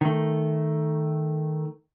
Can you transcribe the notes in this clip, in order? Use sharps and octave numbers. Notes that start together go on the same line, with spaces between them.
D#3 A3